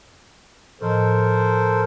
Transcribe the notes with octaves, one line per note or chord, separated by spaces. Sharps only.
A2 F3 A4 A#4 C5 D#5